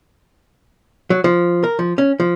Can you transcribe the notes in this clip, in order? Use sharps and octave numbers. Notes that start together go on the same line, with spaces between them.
F#3
F3
A#4
F3
C#4
F3